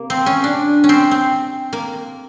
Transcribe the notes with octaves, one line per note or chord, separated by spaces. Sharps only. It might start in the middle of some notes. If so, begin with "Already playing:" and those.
Already playing: C3 A#3
C4
C#4
D4
C#4
C4
C4
A#3